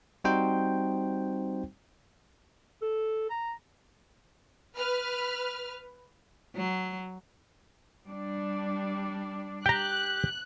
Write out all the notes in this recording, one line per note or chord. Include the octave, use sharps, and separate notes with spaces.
G3 C4 D#4 F#4 C5 G5
A4
A#5
B4 F6
F#3
G3 D4
G4 G5 A#5 F#6